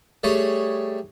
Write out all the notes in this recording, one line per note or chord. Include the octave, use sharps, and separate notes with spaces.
G3 A3 G#4 C#5